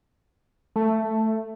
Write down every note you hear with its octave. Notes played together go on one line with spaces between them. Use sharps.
A3